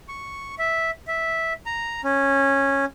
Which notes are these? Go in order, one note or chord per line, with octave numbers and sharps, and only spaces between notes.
C#6
E5
E5
A#5
C#4